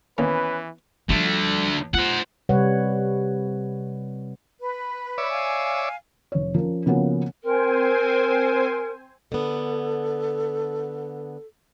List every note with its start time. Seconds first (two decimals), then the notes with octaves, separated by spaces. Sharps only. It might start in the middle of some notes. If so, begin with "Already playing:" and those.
0.18 D#3 E3 A#3 B3 C#4 B4
1.09 D3 F3 G3 A3
1.94 F4 C5 F#5
2.49 C3 G3 B4 C#5 F#5
4.60 B4
5.18 C#5 D5 E5
5.31 F5 G#5
6.32 F1 C#5
6.54 F3 C#4 A#4
6.86 C#3 F3 A#3 B3 C#4 F#4
7.43 C4 A#4 C5 G#5
9.32 D3 B3 A4